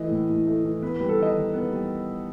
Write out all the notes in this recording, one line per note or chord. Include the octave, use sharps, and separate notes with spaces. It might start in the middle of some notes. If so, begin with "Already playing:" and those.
Already playing: E3 A3 D#5
A2
A2
A3
E3
B3 B4
G3 B4
A4
D#3 D#5
D#3
B3
G3